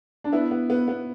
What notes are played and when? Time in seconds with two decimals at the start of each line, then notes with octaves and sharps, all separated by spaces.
0.24 D4
0.32 B3 E4
0.51 B3
0.70 B3
0.88 B3